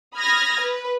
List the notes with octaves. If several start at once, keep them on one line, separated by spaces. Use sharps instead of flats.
B5 D#6 F6 G#6 A#6
B4